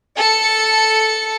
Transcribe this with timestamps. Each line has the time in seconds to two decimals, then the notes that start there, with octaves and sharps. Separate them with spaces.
0.17 A4 C#7